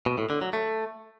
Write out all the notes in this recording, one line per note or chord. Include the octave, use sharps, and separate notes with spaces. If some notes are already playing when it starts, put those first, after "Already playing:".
B2
A2
D3
F#3
A3